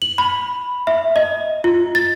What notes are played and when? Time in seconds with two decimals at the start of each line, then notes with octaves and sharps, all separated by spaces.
0.02 F#7
0.18 B5
0.87 E5
1.16 D#5
1.64 F4
1.95 A6